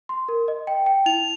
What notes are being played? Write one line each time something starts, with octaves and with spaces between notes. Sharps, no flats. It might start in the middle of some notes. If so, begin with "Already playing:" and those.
C6
A#4
D#5
G5
G5
E4 F7